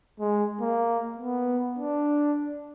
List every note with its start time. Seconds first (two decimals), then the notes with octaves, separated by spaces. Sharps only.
0.20 G#3
0.61 A#3
1.18 B3
1.79 D4